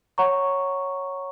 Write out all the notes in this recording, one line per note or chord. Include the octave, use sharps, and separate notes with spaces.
C#5 F#5 A#5 C#6